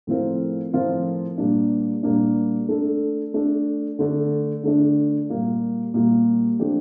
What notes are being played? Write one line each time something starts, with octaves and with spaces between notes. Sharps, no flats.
A2 F3 C4 F4 A#4
A2 F3 C4 F4 A#4
A#2 G3 A#3 D4
A#2 G3 A#3 D4
A3 D4 A4
A3 D4 A4
D3 A3 D4
D3 A3 D4
A#2 G3 A#3 F4
A#2 G3 A#3 F4
F3 A3 D4 G4